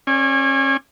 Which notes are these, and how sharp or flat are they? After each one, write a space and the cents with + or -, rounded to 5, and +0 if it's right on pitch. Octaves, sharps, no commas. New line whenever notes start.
C#4 -30 D5 +0 G#5 -20